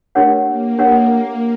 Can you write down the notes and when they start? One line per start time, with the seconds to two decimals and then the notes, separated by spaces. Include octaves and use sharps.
0.15 A3 D4 G4 A#4 C#5 F#5
0.47 A#3
0.79 D4 G4 A#4 C#5 F#5